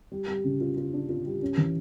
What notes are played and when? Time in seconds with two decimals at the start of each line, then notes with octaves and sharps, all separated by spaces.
0.12 G3
0.28 G3
0.44 C#3
0.61 F4
0.77 F4
0.93 D4
1.09 F4
1.25 G3
1.42 C#4
1.58 E3